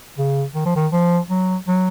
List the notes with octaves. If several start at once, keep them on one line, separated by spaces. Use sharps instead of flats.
C#3
D#3
F3
D#3
F3
F#3
F#3